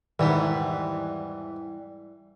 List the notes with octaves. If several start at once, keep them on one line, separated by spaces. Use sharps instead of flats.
E2 G#2 D#3 E3 G3 B3